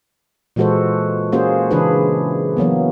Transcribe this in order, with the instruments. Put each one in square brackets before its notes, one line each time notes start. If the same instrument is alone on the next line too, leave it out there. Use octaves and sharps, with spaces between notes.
[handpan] A#2 E3 G#3 F#4 A4 C5
A#3 C#4 F#4 G#4 C5
C#3 E3 D4 G#4 B4
E3 F#3 A#3 B3